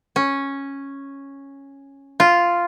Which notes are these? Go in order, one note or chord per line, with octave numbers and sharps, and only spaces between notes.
C#4
F4